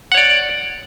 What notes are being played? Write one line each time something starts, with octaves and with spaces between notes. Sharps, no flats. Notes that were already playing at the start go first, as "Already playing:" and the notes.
C#5 D5 F#5